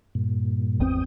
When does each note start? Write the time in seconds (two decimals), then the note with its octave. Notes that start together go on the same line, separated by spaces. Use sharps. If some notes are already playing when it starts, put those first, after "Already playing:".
0.15 G2 A#2
0.80 G#1 E2 C4 G5 D#6